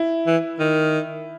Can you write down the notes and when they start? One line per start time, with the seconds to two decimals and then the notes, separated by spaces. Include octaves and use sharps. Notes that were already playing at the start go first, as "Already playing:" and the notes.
Already playing: E4
0.27 E3
0.60 D#3